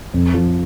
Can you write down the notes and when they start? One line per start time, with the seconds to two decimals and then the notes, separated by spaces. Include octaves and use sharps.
0.14 F2
0.34 F3